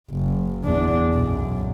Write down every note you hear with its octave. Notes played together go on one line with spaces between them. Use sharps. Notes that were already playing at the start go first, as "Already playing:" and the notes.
F#1
E2 D4
B1 F#2